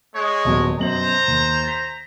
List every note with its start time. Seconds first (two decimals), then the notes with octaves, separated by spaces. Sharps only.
0.16 G#3 C#5
0.45 D#1 B2 F#3
0.79 F#2 B2 C5 A#5 F#7
1.28 D#2
1.64 A6 B6